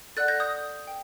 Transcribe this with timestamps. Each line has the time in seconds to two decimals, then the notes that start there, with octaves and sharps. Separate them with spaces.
0.17 A4 D5 F#5 F#6 A6
0.28 G6 A#6
0.40 D#6 G6
0.87 G5